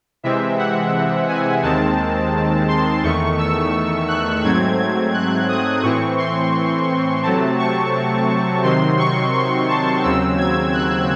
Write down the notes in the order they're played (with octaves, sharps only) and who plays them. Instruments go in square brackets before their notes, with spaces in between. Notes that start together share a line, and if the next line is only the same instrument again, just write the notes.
[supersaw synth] C3 E3 G#3 C4 E5
F#5
G#5
D#2 D#3 G#3 C4 A5
C6
E2 D#3 A3 C#6
E6
F#6
G#2 F#3 A3 C4 G#6
G#6
F#6
D#6
A2 E3 C4 C#6
C6
C3 F#3 A3 C4 A5
C#6
C3 D#3 F#3 C4 C6
C#6
C6
A5
D#2 C#3 F#3 C4 E6
G#6
F#6